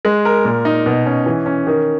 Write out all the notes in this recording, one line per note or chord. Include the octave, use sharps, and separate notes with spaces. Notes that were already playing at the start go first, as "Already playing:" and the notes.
G#3
A#4
A#2
D#4
B2
C#4
E3
C#4
D#3